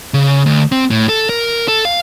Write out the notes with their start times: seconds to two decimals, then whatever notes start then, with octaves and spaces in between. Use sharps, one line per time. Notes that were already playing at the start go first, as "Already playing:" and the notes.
0.14 C#3
0.46 D2
0.72 C4
0.91 A2
1.09 A4
1.29 A#4
1.68 A4
1.85 F5